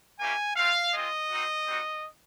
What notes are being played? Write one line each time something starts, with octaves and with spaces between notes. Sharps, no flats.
G3 A#3 C#4 E4 G4 G#5
A3 C4 F4 F5
G#3 C4 F4 D#5
C4 D#4 F#4
G3 C4 D#4 F#4